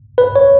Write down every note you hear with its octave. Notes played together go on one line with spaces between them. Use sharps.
B4
C#5